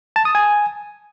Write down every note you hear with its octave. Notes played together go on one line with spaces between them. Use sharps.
A5
D#6
G#5